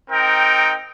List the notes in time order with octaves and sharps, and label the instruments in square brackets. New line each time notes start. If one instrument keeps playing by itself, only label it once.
[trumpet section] C4 D#4 A#4 G5